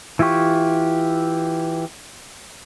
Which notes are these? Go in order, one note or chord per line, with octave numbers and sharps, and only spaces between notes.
E3 E4 F4 G4 C#6